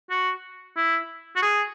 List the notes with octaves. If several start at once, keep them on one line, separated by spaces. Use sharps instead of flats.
F#4
E4
F#4
G#4